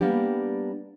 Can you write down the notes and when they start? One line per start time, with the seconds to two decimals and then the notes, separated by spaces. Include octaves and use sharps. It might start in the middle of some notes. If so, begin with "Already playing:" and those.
0.01 G3 A#3 B3 D4 G4